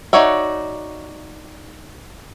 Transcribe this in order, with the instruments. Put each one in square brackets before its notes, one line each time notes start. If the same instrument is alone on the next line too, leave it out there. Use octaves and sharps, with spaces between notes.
[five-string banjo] D#4 F#4 C#5 D5 E5